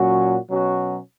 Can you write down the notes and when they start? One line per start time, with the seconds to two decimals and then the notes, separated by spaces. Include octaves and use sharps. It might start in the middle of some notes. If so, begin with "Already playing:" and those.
Already playing: A#2 F#3 C#4 F#4
0.49 B2 F#3 C#4 F#4